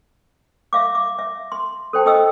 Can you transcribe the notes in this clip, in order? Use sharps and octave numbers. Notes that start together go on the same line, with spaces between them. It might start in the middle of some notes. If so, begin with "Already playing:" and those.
E5 F5 D6
D6
E5
C6
A4 C5 G5 A5
D#4 D#5 G5 D#6 E6